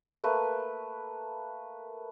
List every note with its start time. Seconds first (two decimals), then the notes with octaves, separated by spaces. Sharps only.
0.24 A3 A#3 B4